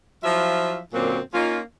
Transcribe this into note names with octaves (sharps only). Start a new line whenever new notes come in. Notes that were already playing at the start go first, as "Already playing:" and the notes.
F3 F#3 E4 F4 E5
F#2 A#2 D3 F#3 A#3 C4
A#3 C#4 D#4 F4